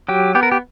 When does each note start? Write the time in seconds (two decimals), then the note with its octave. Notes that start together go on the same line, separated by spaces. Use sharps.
0.08 F#3 G4
0.35 B3 G4
0.43 A#4
0.52 G4